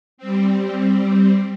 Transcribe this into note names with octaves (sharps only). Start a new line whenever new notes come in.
G3 C4